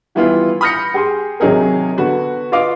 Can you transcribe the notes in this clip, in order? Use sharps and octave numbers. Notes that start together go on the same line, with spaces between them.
D#3 E3 G3 B3 E4 F4
B5 D#6 F6 G6 A#6 C#7
G4 G#4 C6
C3 D#3 F#3 D#4 G#4 A#4
D3 B3 F#4 B4
F4 B4 D#5 F5 D6